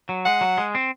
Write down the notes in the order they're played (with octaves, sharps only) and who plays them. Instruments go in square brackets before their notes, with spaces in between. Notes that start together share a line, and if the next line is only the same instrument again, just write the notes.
[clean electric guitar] F#3
[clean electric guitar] G#3 [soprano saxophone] F#5
[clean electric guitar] F#3
G#3
C4